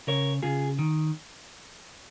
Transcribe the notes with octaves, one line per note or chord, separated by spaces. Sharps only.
C#3 A#4 C#5
C#3 F4 G#4
D#3